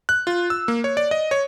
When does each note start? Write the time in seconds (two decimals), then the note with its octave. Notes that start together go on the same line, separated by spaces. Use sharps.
0.09 F#6
0.27 F4
0.50 E6
0.68 A#3
0.84 C#5
0.97 D5
1.11 D#5
1.31 C#5